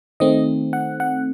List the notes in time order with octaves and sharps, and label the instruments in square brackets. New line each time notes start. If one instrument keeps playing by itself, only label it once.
[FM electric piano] D#3 A3 C4 D#5
F#5
F#5